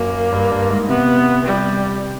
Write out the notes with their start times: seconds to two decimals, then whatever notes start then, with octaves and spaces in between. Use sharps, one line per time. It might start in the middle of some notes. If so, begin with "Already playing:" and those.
Already playing: F#2 A#3
0.32 G2
0.51 G2
0.70 G#2
0.88 C3 B3
1.45 G3